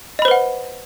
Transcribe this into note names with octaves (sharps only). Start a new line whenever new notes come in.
B4 C5 D#5 F#5 B5